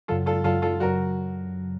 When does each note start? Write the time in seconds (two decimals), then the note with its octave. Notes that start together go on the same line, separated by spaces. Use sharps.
0.08 F#2 C#3 F#3 F4 A4
0.26 F4 A4
0.44 F#2 C#3 F#3 F4 A4
0.62 F4 A4
0.80 F#2 C#3 F#3 F#4 A#4